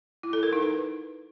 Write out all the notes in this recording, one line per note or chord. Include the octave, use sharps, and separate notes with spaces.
E4
A4
A#4
D#4
B4